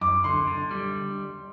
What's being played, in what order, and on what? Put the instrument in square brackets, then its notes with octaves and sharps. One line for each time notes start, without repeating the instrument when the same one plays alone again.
[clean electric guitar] F#2 [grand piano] D6
[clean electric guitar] D3 [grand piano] C6
[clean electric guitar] D3
G3